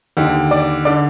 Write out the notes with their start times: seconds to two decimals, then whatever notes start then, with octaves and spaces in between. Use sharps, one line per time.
0.17 D#2 D3
0.51 D5 D6
0.85 D3 D5 D6